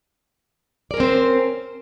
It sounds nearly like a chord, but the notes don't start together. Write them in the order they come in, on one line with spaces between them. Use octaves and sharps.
D5 A#4 C#4 C4 C5